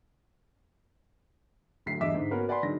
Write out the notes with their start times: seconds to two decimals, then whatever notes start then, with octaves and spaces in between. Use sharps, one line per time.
1.86 D1 D2 F#3 B6 C7
2.00 E2 G2 D#5 E5 D6 B6
2.14 G#2 D3
2.31 A#3 B3 C#4 F#4 A#4 B4
2.48 B4 D5 F#5 G#5 B5 C6
2.63 D3 D#3 F#3 G#3 A#6